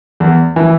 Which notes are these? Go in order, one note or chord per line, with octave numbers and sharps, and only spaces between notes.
E2
E3